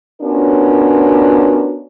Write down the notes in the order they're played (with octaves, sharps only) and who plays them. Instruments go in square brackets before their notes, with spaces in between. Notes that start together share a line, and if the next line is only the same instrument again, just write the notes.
[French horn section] B3 C#4 D4 F4 F#4 A#4